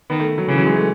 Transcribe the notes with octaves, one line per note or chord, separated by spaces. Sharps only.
D#3 B3
A3
F#3
C#3 E3
F#3
G#3
A3